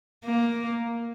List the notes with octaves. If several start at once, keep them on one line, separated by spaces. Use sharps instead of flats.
A#3